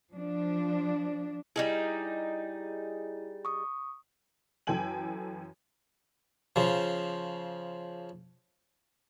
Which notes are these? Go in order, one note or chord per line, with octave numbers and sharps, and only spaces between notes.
F3 D4
G3 D#4 E4 G#4
C#6 D#6
F#2 E3 A4 G5 G#5 F#7
C#3 F3